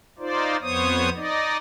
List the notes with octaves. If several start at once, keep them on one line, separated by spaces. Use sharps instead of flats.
D#4 F4 C5 D5
F2 B3 C5 C#5 D#6
D#4 D5 D#5